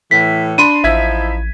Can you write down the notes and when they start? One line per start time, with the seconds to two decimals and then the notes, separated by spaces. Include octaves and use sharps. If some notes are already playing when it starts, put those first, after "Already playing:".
0.11 A2 E3 B6
0.58 D4 B5 C6 D#7
0.84 A1 F3 D#4 E4 E5 G#6 B6